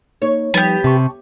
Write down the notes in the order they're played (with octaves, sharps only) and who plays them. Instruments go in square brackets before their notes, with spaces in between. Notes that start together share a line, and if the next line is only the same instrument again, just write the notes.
[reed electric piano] A#3 D#4 [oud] C#5
[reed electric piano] F3 G3 D#4 [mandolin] B3 G4
[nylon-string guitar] C3 [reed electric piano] G5 A5 C#6